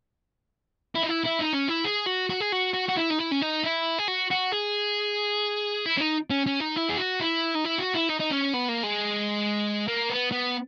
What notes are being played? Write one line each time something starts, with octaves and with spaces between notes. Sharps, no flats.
E4
D#4
E4
E4
D#4
C#4
E4
G#4
F#4
F#4
G#4
F#4
F#4
F#4
E4
D#4
E4
C#4
D#4
E4
G#4
F#4
F#4
G#4
E4
C#4
D#4
C#4
C#4
D#4
E4
G#4
F#4
E4
D#4
E4
F#4
E4
D#4
D#4
C#4
B3
A#3
G#3
A#3
B3
B3